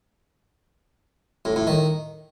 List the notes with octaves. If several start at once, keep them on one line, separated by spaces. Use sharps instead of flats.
A2
A2
D#3